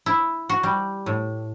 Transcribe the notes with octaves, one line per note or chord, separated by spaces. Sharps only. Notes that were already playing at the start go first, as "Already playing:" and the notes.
E4
F#4
G3
A2